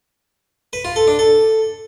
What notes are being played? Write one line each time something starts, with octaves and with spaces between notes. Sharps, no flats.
B4
F4
A4
D4
A4